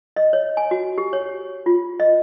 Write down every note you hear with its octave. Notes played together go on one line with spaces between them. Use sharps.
D#5
C#5
G#5
F#4
G4
C#5
F4
D#5